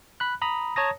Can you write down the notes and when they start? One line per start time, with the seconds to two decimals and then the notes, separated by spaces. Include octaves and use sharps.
0.20 B5 F#6
0.42 A#5 B5 D#6
0.76 C#5 A5 A#5 D#6 A#6